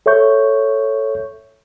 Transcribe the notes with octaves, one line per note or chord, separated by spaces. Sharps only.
A4 C#5 E5 C#6 G6